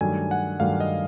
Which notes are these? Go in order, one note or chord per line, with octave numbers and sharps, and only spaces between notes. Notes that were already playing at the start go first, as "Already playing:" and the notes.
G2 D#3 F#3 A3 G#5
F#5
G2 D#3 F#3 A3 F5
D#5